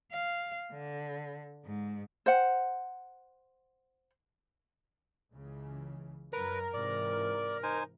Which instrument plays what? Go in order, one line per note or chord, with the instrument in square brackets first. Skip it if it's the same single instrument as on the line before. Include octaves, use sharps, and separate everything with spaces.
[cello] F5
D3
G#2
[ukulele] C5 F#5
[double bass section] C#2 C#3 E3
[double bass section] F#2 F#3 [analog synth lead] A#4 [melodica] B4
[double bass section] G#2 C3 E3 [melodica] D5
[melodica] D#4 C5 G#5